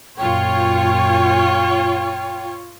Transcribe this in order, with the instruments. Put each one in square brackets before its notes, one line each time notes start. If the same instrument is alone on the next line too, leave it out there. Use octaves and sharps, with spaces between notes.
[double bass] F#2 A#2 [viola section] F4 C#5 [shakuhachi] G5